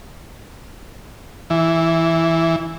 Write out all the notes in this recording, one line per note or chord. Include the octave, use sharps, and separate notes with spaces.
E3